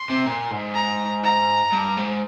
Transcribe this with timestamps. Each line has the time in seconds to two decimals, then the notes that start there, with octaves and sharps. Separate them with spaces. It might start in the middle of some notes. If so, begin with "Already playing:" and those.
Already playing: C6
0.10 C3
0.25 A#2
0.51 G#2
0.75 A#5
1.24 A#5
1.72 G2
1.97 G#2